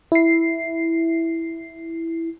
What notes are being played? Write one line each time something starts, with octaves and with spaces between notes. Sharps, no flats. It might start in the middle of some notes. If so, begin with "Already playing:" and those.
E4 C7